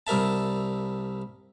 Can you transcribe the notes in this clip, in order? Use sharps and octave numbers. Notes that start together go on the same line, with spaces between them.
C2 G3 A#4 E5 A5